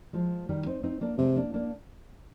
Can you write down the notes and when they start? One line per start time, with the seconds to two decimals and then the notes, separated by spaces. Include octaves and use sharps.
0.13 F3 G#3
0.49 D#3 G3
0.66 C4 D#4
0.83 C4 D#4
1.01 A#3 D4
1.18 C3 G#3 C4
1.36 A#3 D4
1.54 A#3 D4